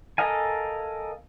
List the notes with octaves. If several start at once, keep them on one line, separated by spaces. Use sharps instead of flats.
A4 A#4 D#5 F5 G#5